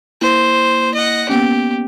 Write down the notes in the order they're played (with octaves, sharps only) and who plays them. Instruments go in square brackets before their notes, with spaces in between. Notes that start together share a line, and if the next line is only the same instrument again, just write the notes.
[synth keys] A#3 E4 [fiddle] C5
[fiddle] D#5 F#5
[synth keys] A#3 B3 C#4 [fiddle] G4